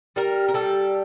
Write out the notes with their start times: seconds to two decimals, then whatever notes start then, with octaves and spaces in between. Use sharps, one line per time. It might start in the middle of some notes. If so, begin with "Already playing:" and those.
0.16 G3 A#4
0.49 A#4
0.54 G3 A4